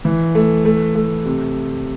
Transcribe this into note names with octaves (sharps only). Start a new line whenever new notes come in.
E3
A3
A3
A3
C3